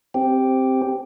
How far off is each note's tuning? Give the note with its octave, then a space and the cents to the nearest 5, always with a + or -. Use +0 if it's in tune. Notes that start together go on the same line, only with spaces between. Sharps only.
C4 +0 G4 +0